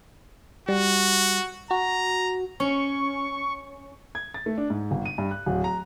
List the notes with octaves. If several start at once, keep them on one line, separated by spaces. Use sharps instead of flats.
G3 F#4
F#4 A#5
C#4 C#6
G#6
A6
A3
D4
G#2
G1
D#7
G2
F#6
D1
A#5